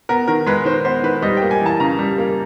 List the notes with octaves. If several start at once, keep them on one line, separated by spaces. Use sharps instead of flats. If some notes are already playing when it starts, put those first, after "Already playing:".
B3 A#4
D#3 A#4
G#3 B4
D#3 C5
B3 C5
D#3 B4
G3 D#5
G5
A#3
G#5
E3 A5
C#3 A#5
G3
A#3